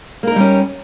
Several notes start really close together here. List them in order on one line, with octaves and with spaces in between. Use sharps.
A#3 A#4 D#4 G3 C#4